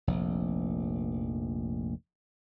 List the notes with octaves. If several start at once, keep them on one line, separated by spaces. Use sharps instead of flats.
F1 A#1